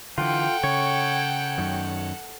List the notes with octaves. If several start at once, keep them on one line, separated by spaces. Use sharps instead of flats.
D3 E3 F4 A4 F#5 G5
C#3 C#5
F#2 D#3